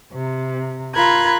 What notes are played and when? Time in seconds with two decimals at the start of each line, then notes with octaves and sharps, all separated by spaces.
0.13 C3
0.94 F4 A#4 B5 F#6 G#6